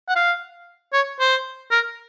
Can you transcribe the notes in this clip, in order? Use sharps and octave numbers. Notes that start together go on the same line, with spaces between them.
F#5
F5
C#5
C5
A#4